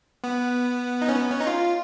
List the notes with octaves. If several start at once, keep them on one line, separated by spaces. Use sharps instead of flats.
B3
D#4
C#4
B3
C#4
D#4
F4